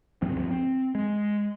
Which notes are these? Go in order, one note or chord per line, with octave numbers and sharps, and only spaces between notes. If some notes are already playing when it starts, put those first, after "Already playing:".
D2 G2 F3 C4
C4
G#3